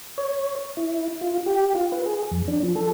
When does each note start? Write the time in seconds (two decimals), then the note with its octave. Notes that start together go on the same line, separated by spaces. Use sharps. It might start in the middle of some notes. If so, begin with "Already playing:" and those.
0.18 C#5
0.77 E4
1.21 F4
1.46 G4
1.75 F4
1.92 B4
2.06 G#4
2.31 F2
2.48 D4
2.63 F3
2.76 A4